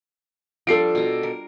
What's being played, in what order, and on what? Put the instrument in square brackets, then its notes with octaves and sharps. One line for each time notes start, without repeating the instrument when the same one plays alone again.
[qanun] F3 G3 D4 [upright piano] A4 C7 D7
[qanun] B2 A#5
A#4